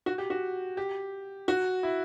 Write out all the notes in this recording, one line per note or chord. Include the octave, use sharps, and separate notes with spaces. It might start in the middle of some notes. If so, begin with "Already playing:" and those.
F#4
G4
F#4
G4
F#4
E4